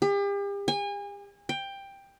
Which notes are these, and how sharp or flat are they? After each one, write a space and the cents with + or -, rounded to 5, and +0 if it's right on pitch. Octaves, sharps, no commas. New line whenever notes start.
G4 +40
G#5 -35
G5 +10